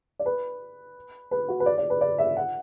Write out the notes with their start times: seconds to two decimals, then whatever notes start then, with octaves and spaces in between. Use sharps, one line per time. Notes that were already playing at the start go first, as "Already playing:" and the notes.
0.19 D5
0.26 B4
1.31 B4
1.49 F#4
1.60 B4
1.66 D5
1.78 D5
1.90 B4
2.01 D5
2.18 E5
2.37 F#5